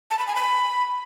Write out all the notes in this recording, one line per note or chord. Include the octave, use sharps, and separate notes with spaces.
A5
B5
G#5
B5